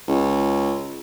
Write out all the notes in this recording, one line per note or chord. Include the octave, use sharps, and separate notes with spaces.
C#2